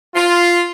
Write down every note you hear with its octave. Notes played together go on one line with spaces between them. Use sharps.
F4